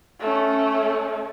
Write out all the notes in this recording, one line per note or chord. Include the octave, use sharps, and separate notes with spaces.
A3 C#4